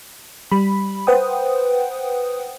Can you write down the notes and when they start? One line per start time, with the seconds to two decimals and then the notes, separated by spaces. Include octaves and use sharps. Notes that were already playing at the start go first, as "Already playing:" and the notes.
0.51 G3 B5
1.07 B4 C5 F#5 G5 D#6